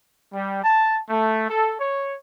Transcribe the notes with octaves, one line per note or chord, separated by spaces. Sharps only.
G3
A5
A3
A4
C#5